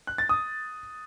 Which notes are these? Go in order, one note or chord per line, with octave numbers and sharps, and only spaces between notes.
F#6
A6
D#6